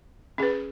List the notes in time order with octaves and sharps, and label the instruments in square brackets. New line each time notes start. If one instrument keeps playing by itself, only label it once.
[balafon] C#4 G#4 B4